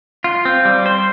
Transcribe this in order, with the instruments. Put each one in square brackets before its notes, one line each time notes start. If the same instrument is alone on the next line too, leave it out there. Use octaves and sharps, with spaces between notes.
[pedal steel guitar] F4
C4
G3
C5